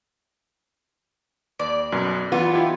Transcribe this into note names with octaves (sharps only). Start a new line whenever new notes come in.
D#2 D5
B1 F#2 B2
E3 B3 F4
D#4 E4 G4